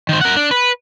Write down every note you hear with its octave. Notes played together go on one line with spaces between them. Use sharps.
D#3 C5
A#4 F#5
D4
B4